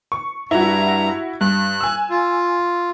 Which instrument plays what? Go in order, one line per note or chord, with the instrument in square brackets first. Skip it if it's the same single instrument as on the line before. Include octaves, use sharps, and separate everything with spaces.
[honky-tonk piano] C#6
[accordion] G2 A#5 [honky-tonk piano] E4 F#4
[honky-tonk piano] G2 [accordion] F#6
[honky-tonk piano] G#5 E6
[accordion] F4